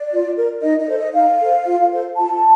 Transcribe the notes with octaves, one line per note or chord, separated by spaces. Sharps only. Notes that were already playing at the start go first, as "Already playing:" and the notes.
Already playing: D5
F4
A#4
D#4 D#5
D#5
A4 C5
D#5
D#4 F5
A4 C5
F4
A4 C5
F4 A5